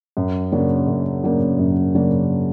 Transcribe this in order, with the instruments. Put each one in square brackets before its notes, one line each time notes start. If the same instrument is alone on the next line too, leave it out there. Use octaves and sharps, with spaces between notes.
[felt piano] F#2
C#3 F#3 A#3 D4
F#2
C#3 F#3 A#3 D4
F#2
C#3 F#3 A#3 D4